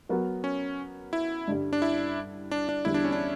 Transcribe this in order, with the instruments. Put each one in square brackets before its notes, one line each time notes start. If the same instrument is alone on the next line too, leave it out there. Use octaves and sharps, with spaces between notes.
[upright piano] F#3 B3 F#4 A#4
[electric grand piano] C#4
E4
[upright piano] G2 D3 G3
[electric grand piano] D4
E4
D4
D4
[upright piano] E2 D3 G3 [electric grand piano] E4
[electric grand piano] D4
C#4
D4